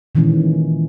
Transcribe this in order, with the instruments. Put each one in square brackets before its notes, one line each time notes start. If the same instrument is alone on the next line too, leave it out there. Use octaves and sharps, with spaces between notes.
[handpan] A#2 D#3 E3 G#3 C#4